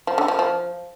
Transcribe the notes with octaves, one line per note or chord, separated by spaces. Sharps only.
F3
D3
F3
F3